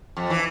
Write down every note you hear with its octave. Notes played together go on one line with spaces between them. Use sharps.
F2
E3